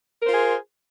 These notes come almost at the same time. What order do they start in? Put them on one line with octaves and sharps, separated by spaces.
A#4 C5 F4 G#4